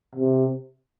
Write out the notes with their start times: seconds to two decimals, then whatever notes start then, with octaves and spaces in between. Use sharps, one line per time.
0.16 C3